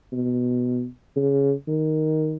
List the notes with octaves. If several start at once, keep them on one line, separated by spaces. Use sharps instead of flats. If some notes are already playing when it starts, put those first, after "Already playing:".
B2
C#3
D#3